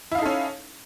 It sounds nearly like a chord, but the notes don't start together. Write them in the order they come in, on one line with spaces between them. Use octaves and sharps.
E4 F5 D#4 A4 C#4